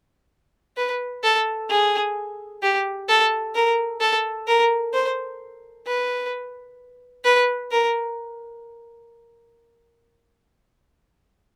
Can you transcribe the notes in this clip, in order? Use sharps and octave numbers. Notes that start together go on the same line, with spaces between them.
B4
A4
G#4
G4
A4
A#4
A4
A#4
C5
B4
B4
A#4